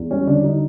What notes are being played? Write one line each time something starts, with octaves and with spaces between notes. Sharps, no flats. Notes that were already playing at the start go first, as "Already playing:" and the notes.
Already playing: E2
G3 C#4
D3 D4
D#4